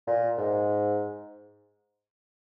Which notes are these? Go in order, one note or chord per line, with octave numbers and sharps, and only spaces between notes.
A#2
G#2